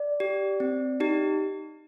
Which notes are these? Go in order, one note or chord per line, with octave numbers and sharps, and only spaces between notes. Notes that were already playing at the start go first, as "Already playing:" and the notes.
Already playing: D5
G4
C4
D#4 G4